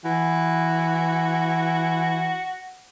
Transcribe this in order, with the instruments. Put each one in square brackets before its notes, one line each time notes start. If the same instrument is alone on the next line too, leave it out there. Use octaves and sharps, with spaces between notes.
[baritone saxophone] E3 [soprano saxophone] F#4